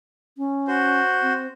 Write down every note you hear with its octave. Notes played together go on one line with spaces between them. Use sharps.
C#4
F#4 C5
C4